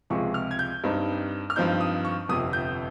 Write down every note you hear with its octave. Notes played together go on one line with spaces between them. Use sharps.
C#2 C3 F3 G#3 C#6
F6
G#6
G6
G2 G3 C4 D#4
F6
G2 F3 C4 D#4 G6
D#6
C#6
G1 F2 C3 D#6
G6